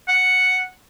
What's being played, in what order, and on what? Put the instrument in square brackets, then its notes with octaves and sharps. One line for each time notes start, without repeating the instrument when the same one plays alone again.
[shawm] F#5